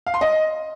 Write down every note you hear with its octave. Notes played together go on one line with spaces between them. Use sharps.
F5
C6
D#5